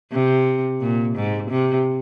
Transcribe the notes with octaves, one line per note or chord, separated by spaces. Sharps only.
C3
A#2
G#2
C3